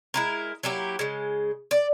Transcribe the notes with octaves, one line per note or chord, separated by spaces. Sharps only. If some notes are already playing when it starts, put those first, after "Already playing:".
G#3 E4 A#4
F#3 A#3 E4 G4
C#3 G#3
D5